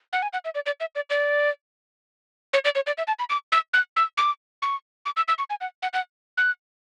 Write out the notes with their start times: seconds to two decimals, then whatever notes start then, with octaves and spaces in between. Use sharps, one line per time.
0.13 F#5
0.22 G#5
0.33 F#5
0.45 E5
0.55 D5
0.66 D5
0.80 E5
0.95 D5
1.10 D5
2.53 C#5
2.65 D5
2.75 C#5
2.87 D5
2.98 E5
3.08 A5
3.19 B5
3.30 D6
3.52 E6
3.73 F#6
3.96 E6
4.17 D6
4.62 C#6
5.05 D6
5.17 E6
5.28 E6
5.38 C#6
5.50 G#5
5.61 F#5
5.82 F#5
5.93 F#5
6.38 F#6